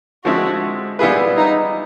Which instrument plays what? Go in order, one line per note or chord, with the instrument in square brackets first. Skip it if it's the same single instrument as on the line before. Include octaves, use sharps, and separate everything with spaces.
[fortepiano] D3 F3 G#3 C4 E4 [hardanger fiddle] F#4
[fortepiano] G3 B3 E4 G#4 B4 [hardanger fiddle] F4
[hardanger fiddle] D#4